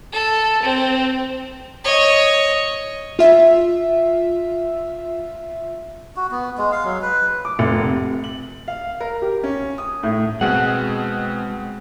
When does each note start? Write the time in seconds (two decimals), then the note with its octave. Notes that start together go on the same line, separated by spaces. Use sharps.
0.12 A4
0.63 C4
1.85 C#5 D#5
3.19 F4 E5
6.16 F#4
6.31 B3
6.58 G#3
6.72 F5
6.85 F#3
7.02 B4
7.45 D6
7.59 F1
7.83 C3
8.24 F#7
8.68 F5
9.00 A#4
9.22 G4
9.44 C#4
9.78 D#6
10.03 A2
10.41 B2 G#3 C4 G#4 F#5